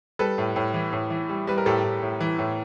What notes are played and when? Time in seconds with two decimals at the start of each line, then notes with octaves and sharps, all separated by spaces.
0.19 G3 A4 B4
0.38 A2
0.56 A2
0.74 E3
0.93 A2
1.10 E3
1.29 G3
1.47 G3 B4
1.58 A#4
1.66 A2 G4 A4
1.84 A2
2.03 A2
2.21 E3
2.39 A2